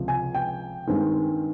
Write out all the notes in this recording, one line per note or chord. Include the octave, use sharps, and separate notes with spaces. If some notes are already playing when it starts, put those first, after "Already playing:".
Already playing: C#2 C3 F3
G#5
G5
G2 D#3 G#3 C4